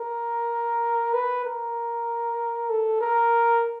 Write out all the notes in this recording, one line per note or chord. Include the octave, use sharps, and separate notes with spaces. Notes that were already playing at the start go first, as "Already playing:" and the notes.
Already playing: A#4
B4
A#4
A4
A#4